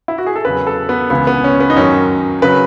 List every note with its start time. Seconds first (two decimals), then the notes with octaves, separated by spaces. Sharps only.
0.08 E4
0.18 F#4
0.26 G#4
0.36 A4
0.45 E2 C#3 F#3 B4
0.67 A4
0.89 B3
1.10 C#2 C#3 E3 B3
1.27 B3
1.44 C#4
1.60 B3
1.70 D#4
1.76 F#2 D#3 F#3 C#4
2.42 C#3 F#3 B4